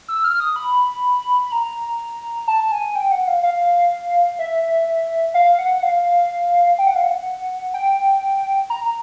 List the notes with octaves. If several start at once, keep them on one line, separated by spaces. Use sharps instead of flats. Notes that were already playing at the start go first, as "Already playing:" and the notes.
E6
F6
D#6
B5
B5
A#5
A5
G#5
G5
F#5
F5
F5
E5
F5
F#5
F5
G5
F#5
F5
F#5
G5
A#5